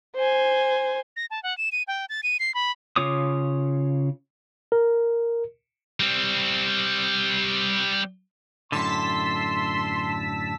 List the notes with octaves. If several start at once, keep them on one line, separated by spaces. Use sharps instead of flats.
C5 G#5
A#6
A5
F#5
E7
D#7
G5
A6
D#7
C7
B5
C#3 F4 C#5 D6 D#6
A#4
G3 C4
F#2 A2 D3 A5 C6 E6 B6